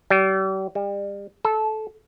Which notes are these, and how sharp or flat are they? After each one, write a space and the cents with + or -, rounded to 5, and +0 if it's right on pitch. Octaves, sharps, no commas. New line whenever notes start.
G3 -40
G3 +35
A4 -15